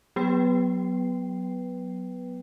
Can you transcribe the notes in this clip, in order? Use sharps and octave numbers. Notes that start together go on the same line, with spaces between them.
F#3 B3 B4 G5 C7